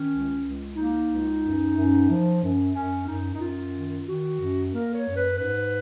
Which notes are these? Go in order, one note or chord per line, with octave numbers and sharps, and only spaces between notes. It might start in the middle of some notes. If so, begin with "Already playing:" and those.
Already playing: D#3 C#4
C#2
C#2
A#3 D#4
C#2
F#2
F#2
F3
F#2
F#2 C#4
F#2 D#4
D#4
F#2 F4
D#3
D#3 F#4
F#2
A#3 A#4
C#5
F#2
B4
G#2 B4